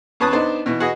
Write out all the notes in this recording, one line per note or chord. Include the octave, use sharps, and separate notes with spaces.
E2 C#4 B4 A5 D#6 F#6
B3 D4 D#4 C5
B2 E3
F#4 G#4 B4 D#5